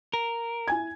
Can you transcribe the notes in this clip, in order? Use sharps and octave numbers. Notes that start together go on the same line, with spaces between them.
A#4
E4 G#5 G#6